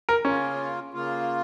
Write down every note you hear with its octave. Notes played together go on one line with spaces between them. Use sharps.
A#4
C#3 A#3 C#4 F4
C#3 A#3 F4